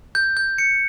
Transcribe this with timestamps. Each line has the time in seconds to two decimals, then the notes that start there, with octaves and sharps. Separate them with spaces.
0.15 G6
0.37 G6
0.58 C#7